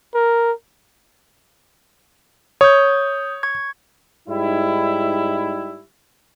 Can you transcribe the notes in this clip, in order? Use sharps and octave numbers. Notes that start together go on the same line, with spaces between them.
A#4
C#5 D#6 G6
C#6 G#6
G#2 G3 D#4 E4